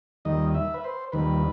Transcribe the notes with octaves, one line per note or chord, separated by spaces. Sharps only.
D#2 D#3 G3 D#5
E5
B4
C5
D#2 D#3 G3 B4